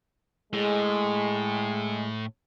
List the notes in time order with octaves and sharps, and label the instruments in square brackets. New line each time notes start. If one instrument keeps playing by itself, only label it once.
[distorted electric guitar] A2 [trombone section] G#3